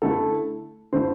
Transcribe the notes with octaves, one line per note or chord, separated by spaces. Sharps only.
D3 A3 E4 A4
D3 A3 E4 C5